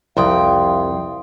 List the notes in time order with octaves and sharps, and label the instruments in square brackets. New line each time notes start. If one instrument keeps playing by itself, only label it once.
[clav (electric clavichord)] C2 [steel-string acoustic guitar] F2 G5 [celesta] E4 C6 D#6 [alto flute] F5